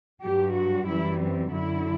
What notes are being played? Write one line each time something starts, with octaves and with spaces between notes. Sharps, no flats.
G2 F#3 G4
F#4
F#2 E3 G3 E4
C4
F#2 D3 F#3 E4